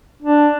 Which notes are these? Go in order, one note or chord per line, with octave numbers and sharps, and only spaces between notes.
D4